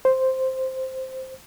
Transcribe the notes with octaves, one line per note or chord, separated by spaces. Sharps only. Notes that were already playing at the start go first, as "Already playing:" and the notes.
C5